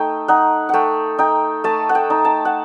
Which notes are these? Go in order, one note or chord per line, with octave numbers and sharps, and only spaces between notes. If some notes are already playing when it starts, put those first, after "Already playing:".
Already playing: A3 D#4 G5
D#4 F#5
A3 F#5 G5
D#4 G5
A3 A5
F#5
G5
D#4
A5
F#5